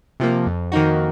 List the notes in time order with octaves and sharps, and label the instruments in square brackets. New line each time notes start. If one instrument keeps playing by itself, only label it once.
[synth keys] C3 F3 A#3
F2
D#3 A#3 D#4 F#4